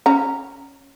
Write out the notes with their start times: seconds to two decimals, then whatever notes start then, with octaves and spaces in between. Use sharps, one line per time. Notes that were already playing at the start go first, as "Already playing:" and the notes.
0.06 C#4 A#5